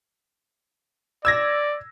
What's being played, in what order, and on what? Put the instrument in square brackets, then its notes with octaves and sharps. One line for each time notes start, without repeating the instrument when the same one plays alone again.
[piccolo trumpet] D5 [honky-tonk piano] E6 G#6 A#6